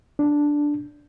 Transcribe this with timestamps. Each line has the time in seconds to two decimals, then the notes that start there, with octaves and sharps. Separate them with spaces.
0.19 D4